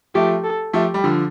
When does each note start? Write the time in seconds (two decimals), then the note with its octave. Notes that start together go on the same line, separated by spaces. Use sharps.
0.15 F3 A3 G4
0.44 A4
0.73 F3 A3 G4
0.94 G3
1.04 D3 F3